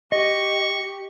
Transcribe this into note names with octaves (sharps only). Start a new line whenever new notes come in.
G4 D#5 C#6